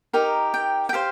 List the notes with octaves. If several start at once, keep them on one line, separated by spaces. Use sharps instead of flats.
D#4 G4 A#4
G5
G5
G4 C5 F5